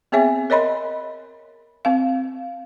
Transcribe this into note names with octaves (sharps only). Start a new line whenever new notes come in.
B3 C4 G#4 C#5 E5 G#5
A#4 C#5 D#5 B5 C6
C4 F5